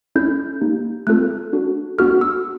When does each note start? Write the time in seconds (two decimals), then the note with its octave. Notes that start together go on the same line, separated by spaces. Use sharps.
0.15 C#4 E4 A4 G6
0.61 A#3 D#4 G4
1.07 A3 C4 F4 A4 F#6
1.53 D4 F#4 A4
1.98 B3 D4 F#4 A4 F6
2.21 E6